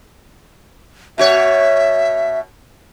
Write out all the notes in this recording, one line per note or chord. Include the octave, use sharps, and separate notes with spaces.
B2 F#4 C#5 E5